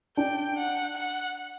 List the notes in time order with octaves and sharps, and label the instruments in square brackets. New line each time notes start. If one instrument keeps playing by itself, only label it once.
[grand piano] D4 [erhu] G5
[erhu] F#5
F#5